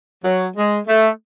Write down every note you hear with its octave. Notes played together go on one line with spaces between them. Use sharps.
F#3
G#3
A3